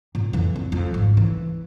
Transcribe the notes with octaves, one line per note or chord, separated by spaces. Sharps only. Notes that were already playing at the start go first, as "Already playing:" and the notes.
A#2
F2 E3
C4
F2
G#1
E3